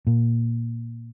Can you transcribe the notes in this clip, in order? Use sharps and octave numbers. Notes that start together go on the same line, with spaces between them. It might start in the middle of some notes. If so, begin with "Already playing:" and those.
A#2